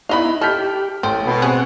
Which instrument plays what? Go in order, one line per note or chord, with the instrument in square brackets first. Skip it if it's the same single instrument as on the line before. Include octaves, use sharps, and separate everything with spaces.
[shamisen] B3 D#5 F5 [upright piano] D#4 B5 [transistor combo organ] E4
[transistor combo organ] G4 [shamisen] A4 [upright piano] F6 G6 B6
[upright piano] A1 [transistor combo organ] A3 [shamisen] C4
[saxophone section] B2
[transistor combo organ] C4 F#5 [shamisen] G#4